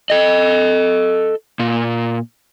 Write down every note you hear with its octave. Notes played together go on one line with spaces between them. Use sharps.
A4 D#5
A#2